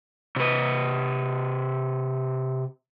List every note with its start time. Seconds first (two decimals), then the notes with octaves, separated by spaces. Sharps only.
0.36 C3 B4